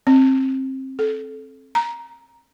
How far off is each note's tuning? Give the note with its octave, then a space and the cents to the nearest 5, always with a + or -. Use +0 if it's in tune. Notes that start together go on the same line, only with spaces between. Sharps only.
C4 +25
A4 -20
A#5 +10